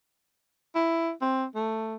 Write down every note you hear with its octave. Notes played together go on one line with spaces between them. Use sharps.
E4
C4
A3